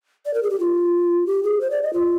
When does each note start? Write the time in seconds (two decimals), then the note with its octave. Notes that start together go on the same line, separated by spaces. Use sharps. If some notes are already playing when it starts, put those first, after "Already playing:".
0.26 D5
0.34 A#4
0.43 G#4
0.50 G4
0.60 F4
1.26 G4
1.43 G#4
1.61 C5
1.71 D5
1.83 D#5
1.93 F4